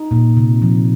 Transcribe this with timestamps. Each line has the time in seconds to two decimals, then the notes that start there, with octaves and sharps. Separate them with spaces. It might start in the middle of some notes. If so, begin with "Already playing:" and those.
Already playing: D#4
0.11 A#2
0.37 C3
0.62 F3